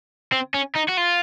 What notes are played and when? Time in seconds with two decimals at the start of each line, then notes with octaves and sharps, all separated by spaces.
0.32 C4
0.54 C#4
0.75 D#4
0.89 F#4
0.97 F4